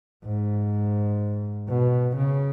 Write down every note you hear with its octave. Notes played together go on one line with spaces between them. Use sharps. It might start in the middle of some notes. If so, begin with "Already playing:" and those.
G#2
B2
C#3